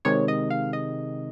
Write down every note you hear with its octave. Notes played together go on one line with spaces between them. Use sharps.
C3 D#3 G#3 C#5
D#5
F5
D#5